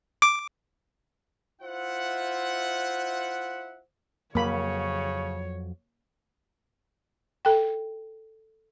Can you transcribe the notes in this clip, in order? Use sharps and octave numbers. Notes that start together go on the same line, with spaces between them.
D6
E4 F4 C5 E5 F#5
F2 C#3 F#3 A#3 C#5 B5
A4 G5